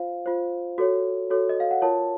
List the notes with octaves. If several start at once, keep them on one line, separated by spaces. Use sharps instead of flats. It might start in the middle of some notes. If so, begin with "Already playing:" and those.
Already playing: F4 C5 F5
F4 C5
F#4 A4 C#5
F#4 A4 C#5
D#5
F5
F#5
F4 A#4 C#5 A5